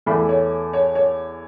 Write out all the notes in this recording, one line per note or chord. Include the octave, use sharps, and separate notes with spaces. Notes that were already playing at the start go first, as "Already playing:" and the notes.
E2 E3 A3 B5
C#5
C#5
C#5